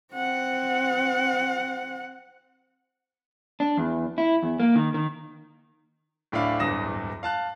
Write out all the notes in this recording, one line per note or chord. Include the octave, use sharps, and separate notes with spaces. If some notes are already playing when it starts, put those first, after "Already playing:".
C4 F#5
D4
E2
E4
E2
A#3
D#3
D#3
D1 A2 D4 E5 F5 B5
D1 E2 G2 D#6 A#6 E7
F5 A5 F#6